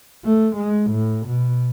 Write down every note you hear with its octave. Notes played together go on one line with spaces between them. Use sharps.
A3
G#3
A2
B2